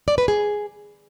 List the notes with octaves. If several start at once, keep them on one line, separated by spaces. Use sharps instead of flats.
D5
B4
G#4